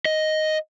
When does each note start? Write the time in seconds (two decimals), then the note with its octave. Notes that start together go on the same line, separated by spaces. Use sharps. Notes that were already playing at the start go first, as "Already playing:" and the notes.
0.05 D#5